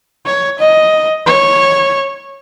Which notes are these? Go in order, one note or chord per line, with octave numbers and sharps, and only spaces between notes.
C#5
D#5
C#5